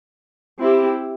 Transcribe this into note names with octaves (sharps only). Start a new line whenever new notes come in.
C4 E4 G4